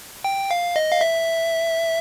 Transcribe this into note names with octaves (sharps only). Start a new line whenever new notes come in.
G5
F5
D#5
F5
E5